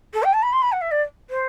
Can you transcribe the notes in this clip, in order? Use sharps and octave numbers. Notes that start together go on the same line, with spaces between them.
A4
G5
A5
B5
C6
B5
F#5
E5
D5
C5